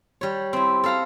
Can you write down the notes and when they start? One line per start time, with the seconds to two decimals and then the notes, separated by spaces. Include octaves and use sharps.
0.21 G3 C#5
0.53 C4 E4
0.84 A4 F5 A#5